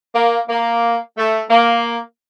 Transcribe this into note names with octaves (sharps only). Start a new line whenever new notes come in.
A#3
A#3
A3
A#3